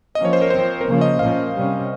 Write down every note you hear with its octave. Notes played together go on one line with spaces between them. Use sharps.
F3 A#3 C#4 D#5
C#5
C5
A#4
F3 C4 C5
A#4
C#3 F3 A#3 C#4 C5
D#5
A#2 F3 A#3 C#4 F5
C3 G3 C#4